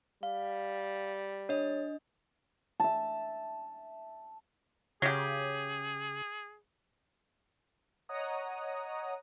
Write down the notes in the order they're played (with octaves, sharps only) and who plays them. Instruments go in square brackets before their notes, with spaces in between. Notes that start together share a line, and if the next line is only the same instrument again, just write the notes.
[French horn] G3 [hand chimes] F5
[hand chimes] D4 D#5 [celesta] C#5
[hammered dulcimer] E5 A5
[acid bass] C#3 [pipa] F#3 G4 [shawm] G#4
[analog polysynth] C#5 D#5 F#5 A#5 D#6